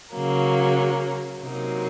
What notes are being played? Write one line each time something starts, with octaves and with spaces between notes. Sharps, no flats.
C#3 F#3 A#3
C3 F#3 A#3 D#4